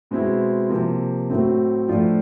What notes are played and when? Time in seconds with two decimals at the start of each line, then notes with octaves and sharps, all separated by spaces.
0.11 B2 G#3 C4 E4
0.70 C3 F3 A#3
1.30 A2 F#3 A3 C4
1.89 A2 F3 A3 D4 F4